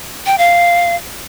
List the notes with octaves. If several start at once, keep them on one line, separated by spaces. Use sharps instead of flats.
G5
F5